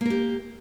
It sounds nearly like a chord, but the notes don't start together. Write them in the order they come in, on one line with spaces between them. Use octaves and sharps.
A#3 A#4 G4